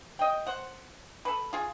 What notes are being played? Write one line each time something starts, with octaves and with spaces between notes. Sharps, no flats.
D#5 G5
C5 F#5
A4 B4
F4 G#4